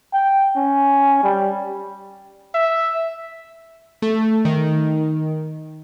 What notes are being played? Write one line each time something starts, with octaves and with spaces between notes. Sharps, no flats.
G5
C#4
G3
E5
A3
D#3